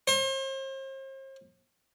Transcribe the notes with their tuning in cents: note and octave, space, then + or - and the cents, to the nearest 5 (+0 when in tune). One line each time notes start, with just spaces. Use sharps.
C5 +40